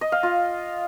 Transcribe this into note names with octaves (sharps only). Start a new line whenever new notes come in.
D#5
F5
F4